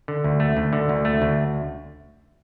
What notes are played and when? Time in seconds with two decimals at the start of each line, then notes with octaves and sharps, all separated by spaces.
0.08 D3
0.24 D2
0.40 A3
0.57 D2
0.73 D3
0.89 D2
1.05 A3
1.22 D2